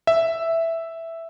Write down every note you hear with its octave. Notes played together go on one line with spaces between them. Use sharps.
E5